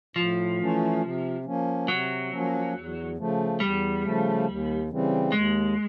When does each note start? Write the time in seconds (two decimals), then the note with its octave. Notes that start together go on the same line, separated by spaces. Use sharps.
0.16 A2 F3
0.59 E3 A3 C#4
1.02 C3
1.44 F3 A#3 C#4
1.88 C3 F#3
2.31 F3 A#3 C#4
2.74 E2
3.17 C#3 F3 A3
3.60 E2 G3
4.03 C#3 F3 A3
4.46 D#2
4.89 C#3 E3 G3 C4
5.32 D#2 G#3